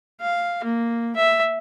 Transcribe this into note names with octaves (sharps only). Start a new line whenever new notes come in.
F5
A#3
E5